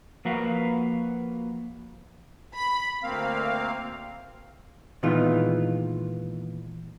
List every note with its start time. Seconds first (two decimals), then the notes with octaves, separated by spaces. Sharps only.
0.25 F3 A#3 F#4 B4 F5
2.55 B5
3.03 D2 A#3 C4 F5
5.03 A#2 D#3 E3 G#3 B3 F4